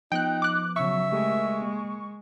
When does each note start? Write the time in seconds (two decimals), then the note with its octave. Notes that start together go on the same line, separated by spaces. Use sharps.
0.12 F3 B3 D#4 G5 F#6
0.42 D6 F#6
0.76 C#3 F#3 E5 C#6
1.12 G#3 A3 G4 A#4
1.62 A#3